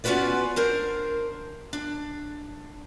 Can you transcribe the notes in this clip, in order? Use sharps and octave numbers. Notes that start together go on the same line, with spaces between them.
B3 C#4 F4 F#4 B4 D5
D4 A#4 C5
D4